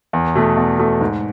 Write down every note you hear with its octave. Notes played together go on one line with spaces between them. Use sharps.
E2
B2 A3
E2
B2 A3
G#2